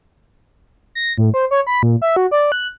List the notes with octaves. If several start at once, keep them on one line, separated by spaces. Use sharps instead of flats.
A#6
A2
C5
C#5
B5
A#2
E5
F#4
D5
F#6